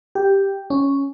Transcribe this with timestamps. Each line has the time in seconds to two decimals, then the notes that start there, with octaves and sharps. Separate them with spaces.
0.15 G4
0.70 C#4